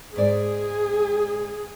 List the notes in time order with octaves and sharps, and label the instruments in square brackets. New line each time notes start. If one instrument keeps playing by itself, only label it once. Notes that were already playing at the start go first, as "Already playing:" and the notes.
[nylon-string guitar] G#2 D5 [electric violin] G#4